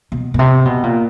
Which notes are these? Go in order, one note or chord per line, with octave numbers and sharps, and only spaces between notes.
B2
B2
C3
B2
A#2